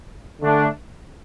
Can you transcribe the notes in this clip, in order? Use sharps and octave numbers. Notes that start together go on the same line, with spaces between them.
D3 A3 D4